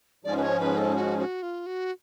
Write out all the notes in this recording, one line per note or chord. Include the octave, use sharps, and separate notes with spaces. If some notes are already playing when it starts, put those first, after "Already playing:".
G#2 F3 G#3 C#4 D5
B4
C#5
B4
A4
F#4
F#4
F4
F#4